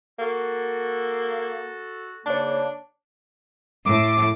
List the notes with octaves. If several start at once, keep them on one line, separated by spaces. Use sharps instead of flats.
A#3 F#4 A4
G#2 C#3 A#3 D4 C#5 A5
A2 D6